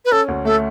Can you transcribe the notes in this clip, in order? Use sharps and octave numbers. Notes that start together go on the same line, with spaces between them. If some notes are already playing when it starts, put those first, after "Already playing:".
B4
C#4 A4
D2
A3 A4